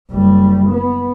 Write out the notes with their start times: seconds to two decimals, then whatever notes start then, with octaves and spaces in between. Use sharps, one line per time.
0.10 F#1 G3
0.70 B3